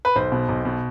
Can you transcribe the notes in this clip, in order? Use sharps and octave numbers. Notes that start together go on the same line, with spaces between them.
B4
B1 C5
B2
B1
B2